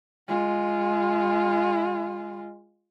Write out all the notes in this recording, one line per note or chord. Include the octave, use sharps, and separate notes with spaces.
G#3 F4